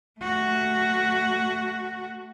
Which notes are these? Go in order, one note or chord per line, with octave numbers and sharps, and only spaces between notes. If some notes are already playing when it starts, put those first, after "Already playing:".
A3 F#4